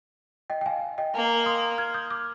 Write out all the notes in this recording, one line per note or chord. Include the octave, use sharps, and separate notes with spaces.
D#5 G5
G5
F5 G#5
D#5 G5
A#3 F5 G#5
C6 D#6
F6 G#6
D#6 G6
D6 F6